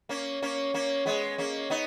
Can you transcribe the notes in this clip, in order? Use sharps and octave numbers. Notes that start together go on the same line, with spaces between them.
A#3 C#4
A#3 C#4
A#3 C#4
G#3 B3
A#3 C#4
B3 D#4